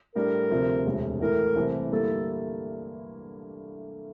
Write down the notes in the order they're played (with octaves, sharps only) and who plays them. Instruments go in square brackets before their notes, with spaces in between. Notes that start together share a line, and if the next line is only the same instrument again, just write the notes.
[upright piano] A2 G3 D4 [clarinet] A#4
[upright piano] D2 C3 F3 C4
E1 D2 C3
[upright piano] A2 E3 A3 E4 [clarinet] A#4
[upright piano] C2 C3 E3 A3 C4
[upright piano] G2 D3 G3 A#3 E4 [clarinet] A4